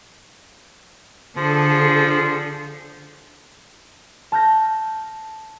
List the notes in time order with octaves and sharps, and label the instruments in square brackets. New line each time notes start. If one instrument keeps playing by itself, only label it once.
[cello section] D3 G#4 A4 [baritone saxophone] F3
[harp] A5 F6 G6 A#6